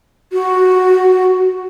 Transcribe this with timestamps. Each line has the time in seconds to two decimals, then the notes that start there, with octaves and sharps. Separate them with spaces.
0.32 F#4